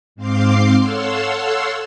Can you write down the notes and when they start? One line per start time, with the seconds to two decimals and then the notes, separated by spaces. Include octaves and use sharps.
0.16 G#2 C4 F5 C6 D6 C7
0.80 A4 C#5 F5 F#5 C6 E6